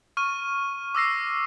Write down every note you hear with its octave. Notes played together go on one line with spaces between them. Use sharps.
C#6 F6 D#7
D6 E6 A#6 C7